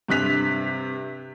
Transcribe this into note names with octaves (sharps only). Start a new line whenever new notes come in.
G2 C3 F#6 B6 F7